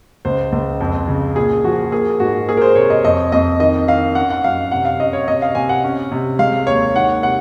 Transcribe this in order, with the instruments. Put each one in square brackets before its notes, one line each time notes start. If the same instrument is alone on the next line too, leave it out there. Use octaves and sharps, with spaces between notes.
[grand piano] C#2 C5
C#2
F2
C#3
A#2 G#4
F3 F#4
A#3 G#4
G#2 F#4
A#3 G#4
A#4
C5
C3 C#5
D#5
F2 D#5
F2 D#5
D#3 D#5
D#3 F5
C#4 F#5
F#5
F#2 F5
C3 F#5
F5
C#4 D#5
C#5
C3 D#5
F5
C3 G#5
F#5
C#4
C3
G#3 F5
D#2 C#5
D#3 F#5
C3 F#5